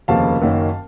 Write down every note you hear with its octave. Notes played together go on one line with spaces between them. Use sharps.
F1 D#2 C#3 F3 A#3 F5 A5
F#1 F#2 D#3 A#3 C#4